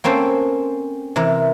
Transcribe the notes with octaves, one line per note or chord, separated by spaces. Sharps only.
A#3 C4 C#4 A4 C5
C3 E3 A#4